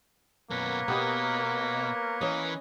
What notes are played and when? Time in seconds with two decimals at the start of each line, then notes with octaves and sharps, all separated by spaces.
0.50 F#2 B2 A#3 A#4 B4 C#5
0.88 B2 B3 G4 D#5
2.21 E3 C#4 D#5